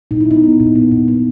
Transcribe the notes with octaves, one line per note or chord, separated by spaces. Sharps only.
A#2 D#4
E4
B3 D#4
B3
A#2
B3
A#2
B3